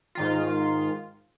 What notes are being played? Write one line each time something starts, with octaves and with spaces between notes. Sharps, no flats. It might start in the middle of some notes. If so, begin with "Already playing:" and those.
G#2 D#3 F4